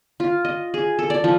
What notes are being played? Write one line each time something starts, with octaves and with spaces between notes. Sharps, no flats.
F4
D#5
G#4
A4
D5
F3